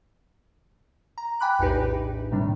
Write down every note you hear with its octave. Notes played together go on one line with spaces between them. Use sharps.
A#5
G5 G#5 B5 D6 F#6
A#1 E2 A2 D#4 G4 B4
A2 C3 D#3 G3 D4